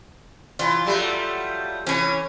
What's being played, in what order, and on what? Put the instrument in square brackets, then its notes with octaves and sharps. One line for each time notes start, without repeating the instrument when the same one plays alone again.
[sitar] E3 [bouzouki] F4
[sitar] F#3 G3 A3
[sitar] E3 [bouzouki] C#4 C#5